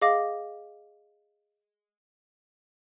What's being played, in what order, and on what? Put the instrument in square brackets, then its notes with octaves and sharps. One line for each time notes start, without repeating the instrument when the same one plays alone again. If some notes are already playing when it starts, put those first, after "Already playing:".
[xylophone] G#4 D#5 F5 D6 A#6